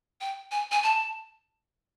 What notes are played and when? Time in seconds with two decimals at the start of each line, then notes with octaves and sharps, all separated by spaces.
0.21 G5
0.51 G#5
0.71 G#5
0.83 A5